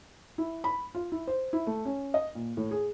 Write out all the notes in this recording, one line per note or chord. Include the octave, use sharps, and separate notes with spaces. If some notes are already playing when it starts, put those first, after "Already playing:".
E4
B5
F4
E4
C5
E4
A3
C#4
D#5
A#2
A2
G#4